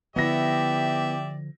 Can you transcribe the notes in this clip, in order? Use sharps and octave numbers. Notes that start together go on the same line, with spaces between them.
D3 F3 B3 E4 G4 D5 E5 A#6